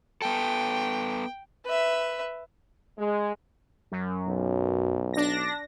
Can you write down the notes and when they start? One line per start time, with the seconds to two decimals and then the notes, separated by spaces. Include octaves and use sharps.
0.22 B3 A4 G5
1.65 B4 E5
2.99 G#3
3.92 F#2
4.28 B1
5.14 D4 A#6